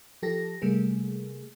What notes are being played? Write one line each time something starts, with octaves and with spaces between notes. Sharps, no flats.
F3 G4 A4 A#6
C3 G3 A3 A#3 G#4